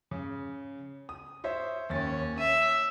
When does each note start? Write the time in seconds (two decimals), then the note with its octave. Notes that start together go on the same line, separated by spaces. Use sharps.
0.11 C#3
1.09 D#6
1.44 C5 C#5 E5
1.90 D#2 C#4 A6
2.38 E5 D#7